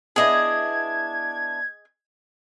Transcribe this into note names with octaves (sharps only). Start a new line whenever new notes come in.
B3 D4 E4 G#4 D#5 G#6